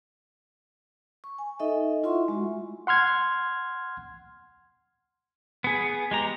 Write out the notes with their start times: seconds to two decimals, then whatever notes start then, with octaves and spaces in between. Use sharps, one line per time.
1.24 C#6
1.39 G#5
1.60 D#4 A4 D#5 E5
2.03 E4 F4 E5 F#5 C6 C#6
2.28 G#3 F#4
2.87 F#5 C6 F6 G#6
5.64 B3 G#4
6.11 G#3 G4 A#5